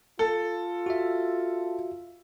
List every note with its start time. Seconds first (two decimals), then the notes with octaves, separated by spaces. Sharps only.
0.19 F4 A4
0.86 F#4 E5